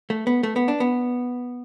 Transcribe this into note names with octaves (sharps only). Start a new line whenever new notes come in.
A3
B3
A3
B3
D4
B3